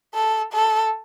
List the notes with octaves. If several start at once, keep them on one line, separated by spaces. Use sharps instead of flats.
A4
A4